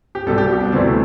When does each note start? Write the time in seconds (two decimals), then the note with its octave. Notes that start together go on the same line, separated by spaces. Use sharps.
0.15 G4
0.26 C2 B2 G3 A4
0.38 G4
0.49 F#4
0.61 D4
0.72 D2 C3 E3 A3 C4